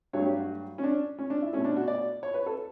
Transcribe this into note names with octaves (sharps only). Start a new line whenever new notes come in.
G2 F#3 A3 C#5
G4
F#4
C#4
D4
C#4
D4
E4
B2 A3 C#4
D4
F#4
D5
C#5
B4
A4